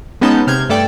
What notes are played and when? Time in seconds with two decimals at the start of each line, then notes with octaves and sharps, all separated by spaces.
0.21 G#3 B3 C#4 D#4 A5 G6
0.47 C3 F6 G6 G#6
0.69 G2 A3 A4 D5 G5